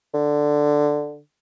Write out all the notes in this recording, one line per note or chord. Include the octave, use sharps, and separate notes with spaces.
D3